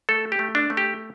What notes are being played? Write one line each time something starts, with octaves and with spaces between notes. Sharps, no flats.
A3 A4
G4
A3
D4
A3
G4